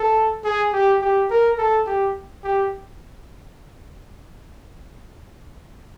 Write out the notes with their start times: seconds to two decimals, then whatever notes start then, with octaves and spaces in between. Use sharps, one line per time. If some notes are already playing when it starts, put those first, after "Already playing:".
Already playing: A4
0.44 G#4
0.73 G4
1.02 G4
1.31 A#4
1.58 A4
1.87 G4
2.44 G4